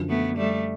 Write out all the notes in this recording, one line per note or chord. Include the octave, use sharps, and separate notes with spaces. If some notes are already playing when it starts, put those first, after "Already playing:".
Already playing: F#2 D3 F3
A3 B3
G3 A3